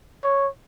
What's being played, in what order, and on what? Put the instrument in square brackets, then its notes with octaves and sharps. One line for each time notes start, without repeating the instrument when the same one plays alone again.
[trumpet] C#5